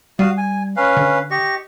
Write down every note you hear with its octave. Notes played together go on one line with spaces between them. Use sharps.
G3 F#4 F5 D#6
G#5
C#4 B4 F5
D3
G4 D#5 C#6